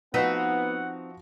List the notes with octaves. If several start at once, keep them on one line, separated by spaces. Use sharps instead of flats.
F3 B3 C4 D#4 F#4 B4 F#5